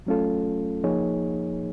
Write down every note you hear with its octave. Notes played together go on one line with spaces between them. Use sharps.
F#3 A3 C#4 F4 A4
F3 A#3 D#4 G#4 C#5